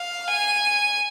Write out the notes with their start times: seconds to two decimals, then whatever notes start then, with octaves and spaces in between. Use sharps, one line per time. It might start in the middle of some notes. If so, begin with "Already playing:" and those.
Already playing: F5
0.27 G#5